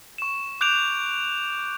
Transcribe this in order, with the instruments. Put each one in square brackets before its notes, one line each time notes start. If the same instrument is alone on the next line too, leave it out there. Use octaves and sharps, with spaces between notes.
[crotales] C#6 E7
D6 F#6 G6 D7 E7 F7